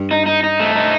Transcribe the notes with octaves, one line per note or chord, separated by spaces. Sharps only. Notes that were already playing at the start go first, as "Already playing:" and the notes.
Already playing: G2
D#4
D#4
D#4
A3
D#4